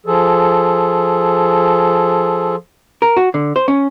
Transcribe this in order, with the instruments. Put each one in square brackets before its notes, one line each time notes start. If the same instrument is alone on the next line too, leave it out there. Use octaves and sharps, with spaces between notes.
[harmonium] F3 G#4 A4
[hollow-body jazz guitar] A#4
F#4
D3
C5
C#4